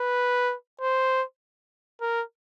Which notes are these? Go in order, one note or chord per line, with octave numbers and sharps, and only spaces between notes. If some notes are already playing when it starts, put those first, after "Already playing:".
Already playing: B4
C5
A#4